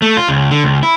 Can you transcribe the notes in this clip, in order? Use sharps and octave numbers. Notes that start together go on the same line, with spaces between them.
A3
F4
C#2
D3
C#2
E4